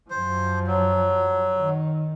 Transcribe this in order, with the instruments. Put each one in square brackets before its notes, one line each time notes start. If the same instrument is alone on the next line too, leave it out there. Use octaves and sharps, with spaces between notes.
[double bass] F#2 F3 [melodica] C5
[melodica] F#3
[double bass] D#3